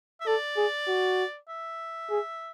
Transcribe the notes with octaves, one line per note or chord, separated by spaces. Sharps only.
E5
A4 D5
G#4
F#4
E5
G#4